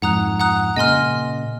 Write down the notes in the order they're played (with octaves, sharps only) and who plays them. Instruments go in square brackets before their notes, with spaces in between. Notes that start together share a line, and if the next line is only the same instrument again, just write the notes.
[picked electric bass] F2 G#2 [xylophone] F#5 A#5 D#6 F#6
[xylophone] F#5 A#5 D#6 F#6
[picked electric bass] A#2 C#3 [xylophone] D#5 G#5 C6 F6